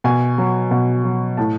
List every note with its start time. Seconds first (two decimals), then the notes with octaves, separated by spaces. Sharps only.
0.04 B2 G#5
0.38 F#3
0.71 B2
1.04 F#3
1.37 A2 A5